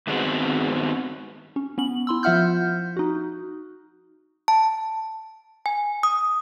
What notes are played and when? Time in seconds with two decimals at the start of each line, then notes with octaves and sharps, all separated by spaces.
0.07 G2 D#3 G#3 B3 C4 F#4
1.56 C#4
1.78 B3 C#4 F#7
2.07 E4 C6 E6
2.23 F3 F4 E5 F#5 F6 G6
2.97 D#4 F#4
4.48 A5
5.66 G#5
6.03 D#6